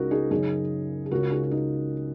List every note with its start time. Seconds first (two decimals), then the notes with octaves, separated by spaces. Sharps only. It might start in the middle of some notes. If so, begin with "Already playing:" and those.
Already playing: C#2 C#3 D#4 F#4 A#4
0.11 D#4 G#4
0.31 F#2 C#3 D#4 G#4
1.06 G#4
1.11 C#2 C#3 F#4 A#4
1.32 D#4 G#4
1.43 F#4
1.51 D#4